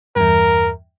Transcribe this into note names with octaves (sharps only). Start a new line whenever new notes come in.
E2 G2 A#4